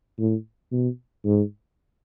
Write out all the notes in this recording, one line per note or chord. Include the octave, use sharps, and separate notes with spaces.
A2
B2
G#2